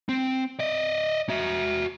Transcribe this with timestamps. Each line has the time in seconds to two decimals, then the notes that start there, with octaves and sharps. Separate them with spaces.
0.09 C4
0.59 D5 D#5
1.29 F#4 E5